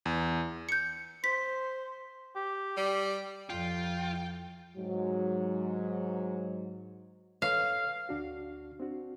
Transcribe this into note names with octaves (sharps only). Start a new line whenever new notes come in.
E2
G6 C#7
C5 B6
G4
G3
F2 F4 G5
G#2 F#3
A4 B4 C#5 F5
D2 D4 F#4
C4 D4 F#4